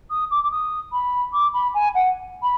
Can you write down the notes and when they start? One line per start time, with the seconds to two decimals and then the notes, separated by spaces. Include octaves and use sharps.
0.10 D#6
0.31 D6
0.43 D6
0.51 D#6
0.92 B5
1.33 D6
1.53 B5
1.74 G#5
1.94 F#5
2.42 B5